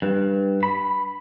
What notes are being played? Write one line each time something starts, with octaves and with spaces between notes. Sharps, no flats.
G2
B5